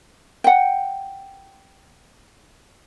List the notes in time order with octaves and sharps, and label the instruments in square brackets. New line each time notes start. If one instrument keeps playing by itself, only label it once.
[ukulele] F#5 G5